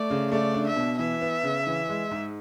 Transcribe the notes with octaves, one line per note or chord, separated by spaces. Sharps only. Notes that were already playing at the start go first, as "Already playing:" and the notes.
Already playing: A3 D5
C#3
A3 D5
D4
E5
B2
E3 E5
B3
C#3
E3
G#3
G#2